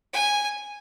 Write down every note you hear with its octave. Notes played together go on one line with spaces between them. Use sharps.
G#5